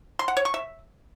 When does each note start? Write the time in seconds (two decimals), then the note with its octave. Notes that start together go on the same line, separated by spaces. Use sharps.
0.19 C6
0.28 F#5
0.37 C#5
0.45 C#6
0.54 E5